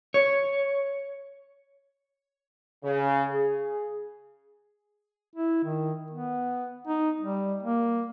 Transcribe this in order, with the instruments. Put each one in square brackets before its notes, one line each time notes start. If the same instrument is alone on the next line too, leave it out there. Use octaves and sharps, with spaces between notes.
[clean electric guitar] C#5
[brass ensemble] C#3
G#4
[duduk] E4
D#3
B3
D#4
G3
A#3